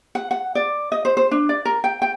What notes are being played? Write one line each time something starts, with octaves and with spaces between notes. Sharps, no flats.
F#5
F#5
D5
D#5
C5
C5
D4
D5
A#4
G5
G5